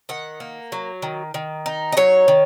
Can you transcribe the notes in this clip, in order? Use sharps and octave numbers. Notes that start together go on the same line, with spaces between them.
D#3 F#5
A#3
F#3
D#3
D#3
D#4
D#5
F#3 C#5
D#3